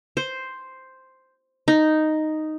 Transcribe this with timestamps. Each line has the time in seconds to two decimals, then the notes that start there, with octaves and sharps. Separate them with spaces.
0.17 C5
1.68 D#4